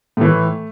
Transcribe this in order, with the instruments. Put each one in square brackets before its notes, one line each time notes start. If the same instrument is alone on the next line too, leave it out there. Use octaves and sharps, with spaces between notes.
[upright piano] A2 E3 A3